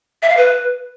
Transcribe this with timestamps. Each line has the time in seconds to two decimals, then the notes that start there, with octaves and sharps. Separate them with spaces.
0.22 E5
0.30 F5
0.37 B4